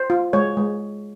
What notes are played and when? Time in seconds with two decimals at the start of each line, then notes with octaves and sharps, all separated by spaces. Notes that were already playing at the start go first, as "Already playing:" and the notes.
Already playing: C5
0.10 F4
0.33 G#3 C#5
0.57 G#3